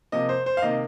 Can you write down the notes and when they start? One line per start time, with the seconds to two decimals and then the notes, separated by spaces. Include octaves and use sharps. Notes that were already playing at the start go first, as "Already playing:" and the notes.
0.12 C3 F3 A#3 D#5
0.29 C5
0.46 C5
0.57 F5
0.62 C3 D#3 A#3 D#5